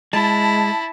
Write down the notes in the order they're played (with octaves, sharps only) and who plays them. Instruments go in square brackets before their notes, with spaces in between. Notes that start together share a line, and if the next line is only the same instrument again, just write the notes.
[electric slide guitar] G#3 [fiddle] E4 [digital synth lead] A5